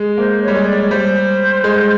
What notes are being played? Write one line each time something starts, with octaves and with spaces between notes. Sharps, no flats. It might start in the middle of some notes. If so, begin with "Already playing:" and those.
Already playing: G#3
A#3 C5
C#5
G3
G#3
D5
C#5
G3 C5
G#3